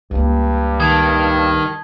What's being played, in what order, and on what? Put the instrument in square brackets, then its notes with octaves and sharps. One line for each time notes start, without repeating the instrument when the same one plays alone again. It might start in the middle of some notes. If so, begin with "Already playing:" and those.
[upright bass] C#2 A#3 [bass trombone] G2
[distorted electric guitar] D#3 [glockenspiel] A5 D#6 G#6